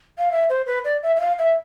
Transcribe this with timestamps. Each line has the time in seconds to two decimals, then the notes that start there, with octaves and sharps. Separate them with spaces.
0.18 F5
0.31 E5
0.49 C5
0.66 B4
0.85 D5
1.03 E5
1.16 E5
1.20 F5
1.38 E5